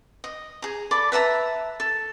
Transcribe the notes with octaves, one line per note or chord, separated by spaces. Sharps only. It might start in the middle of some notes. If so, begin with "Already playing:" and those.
D#5
G#4 A#5
A4 D5 B5 D6
B4 E5 A5 A#5
A4